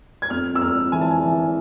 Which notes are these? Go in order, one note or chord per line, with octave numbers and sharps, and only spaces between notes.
G#6
F2 F6
E6
F2 F6
E3 G#5
A5
G#5
E3